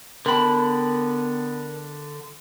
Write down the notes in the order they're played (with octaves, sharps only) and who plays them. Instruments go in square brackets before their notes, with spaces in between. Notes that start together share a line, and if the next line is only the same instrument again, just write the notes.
[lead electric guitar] D3 B5 [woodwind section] B3 [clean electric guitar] A#4 G5 A5